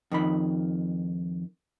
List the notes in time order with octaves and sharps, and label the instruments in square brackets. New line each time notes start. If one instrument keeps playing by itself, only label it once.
[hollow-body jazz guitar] F2 D#3 B5